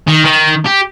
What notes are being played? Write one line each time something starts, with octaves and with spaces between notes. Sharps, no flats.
D#3
D#3
G4